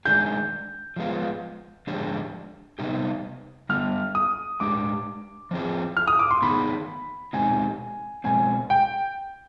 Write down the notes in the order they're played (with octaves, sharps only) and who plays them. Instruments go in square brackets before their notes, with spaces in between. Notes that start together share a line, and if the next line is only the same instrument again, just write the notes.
[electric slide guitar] D#3 G#3 D4 G#4 [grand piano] G6
[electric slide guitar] F3 G#3 B3 F4
D3 F3 G#3 D4 G4
C3 G3 B3 D#4 G4
[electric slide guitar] D3 G3 B3 [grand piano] F6
[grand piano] D#6
[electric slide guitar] G#3 D4 G4 [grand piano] D6
[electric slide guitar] F3 C4 F4 G#4
[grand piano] F6
D#6
D6
C6
[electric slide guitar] D#3 B3 D#4 G#4 [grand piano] B5
[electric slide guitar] B2 G#3 C4 D#4 G4 [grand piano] G#5
[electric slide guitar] B2 G#3 C4 [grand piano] G#5
[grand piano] G5